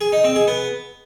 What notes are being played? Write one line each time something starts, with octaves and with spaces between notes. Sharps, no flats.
G#4
D#4
C4
G#4
B3